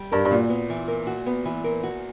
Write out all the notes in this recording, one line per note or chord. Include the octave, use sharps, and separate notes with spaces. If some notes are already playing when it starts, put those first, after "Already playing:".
Already playing: G3
G2 A#4
G2
A#2 F#4
B3
E3
A#4
F#4
B3
E3
A#4
F#4